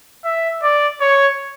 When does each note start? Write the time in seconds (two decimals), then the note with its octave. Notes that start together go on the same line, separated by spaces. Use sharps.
0.25 E5
0.63 D5
1.01 C#5